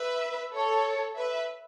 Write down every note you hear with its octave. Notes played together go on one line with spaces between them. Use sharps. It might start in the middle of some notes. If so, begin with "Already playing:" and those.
Already playing: B4 E5
A4 C#5
B4 E5